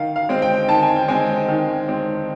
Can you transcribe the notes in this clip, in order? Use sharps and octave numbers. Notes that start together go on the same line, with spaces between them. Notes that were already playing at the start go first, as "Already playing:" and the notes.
Already playing: D#3 F5
F5
G#3 C4
G5
D#3 A5
G#5
G5
G#3 C4 G#5
D#3
G#3 C4